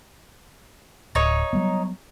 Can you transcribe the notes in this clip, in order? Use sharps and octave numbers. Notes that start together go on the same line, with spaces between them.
D1 D#4 C#5
F#3 G3 B3